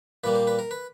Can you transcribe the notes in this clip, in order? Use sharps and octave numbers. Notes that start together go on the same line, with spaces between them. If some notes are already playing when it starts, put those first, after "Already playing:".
A#2 G3 A#3 B4
C5
B4
A#4
B4